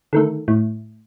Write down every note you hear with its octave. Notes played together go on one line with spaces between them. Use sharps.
D3 D#3 A3
A2